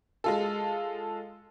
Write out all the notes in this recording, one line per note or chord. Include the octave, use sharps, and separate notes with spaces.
G#3 F4 A4